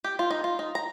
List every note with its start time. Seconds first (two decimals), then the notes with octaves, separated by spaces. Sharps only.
0.04 G4
0.19 F4
0.31 D#4
0.44 F4
0.59 D#4
0.75 A#5